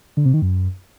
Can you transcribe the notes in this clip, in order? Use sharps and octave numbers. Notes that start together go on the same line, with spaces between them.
D3
C3
D#3
F#2